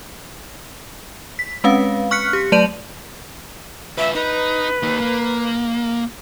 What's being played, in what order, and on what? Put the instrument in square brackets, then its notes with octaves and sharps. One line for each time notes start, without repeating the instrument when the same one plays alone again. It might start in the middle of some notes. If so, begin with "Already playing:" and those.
[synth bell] B6
G#3 C4 C#4 B4 F5
C#6 F6 F#6 B6 C#7
G4
F#3 A3 D5 A5 D#7 F#7
[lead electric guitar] F4 B4 [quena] E5
[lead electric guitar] D#4 [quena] B4
[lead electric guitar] A#3 D#4
A#3